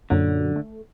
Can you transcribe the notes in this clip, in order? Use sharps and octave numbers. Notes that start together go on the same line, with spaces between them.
F#2 A#2 D3 F#3
A3